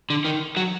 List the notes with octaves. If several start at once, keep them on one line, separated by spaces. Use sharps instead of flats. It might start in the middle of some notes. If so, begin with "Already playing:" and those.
D3
D#3
F#3